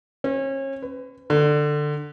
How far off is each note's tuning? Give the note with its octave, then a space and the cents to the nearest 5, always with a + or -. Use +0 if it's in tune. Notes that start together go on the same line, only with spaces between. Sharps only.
C#4 -35
B4 +30
D3 +15